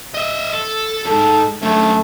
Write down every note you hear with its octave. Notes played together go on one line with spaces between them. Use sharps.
D#5 E5
A4
F2 G#2 A4
F#2 D3 A3